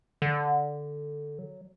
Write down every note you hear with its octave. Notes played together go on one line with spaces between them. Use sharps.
D3
F#3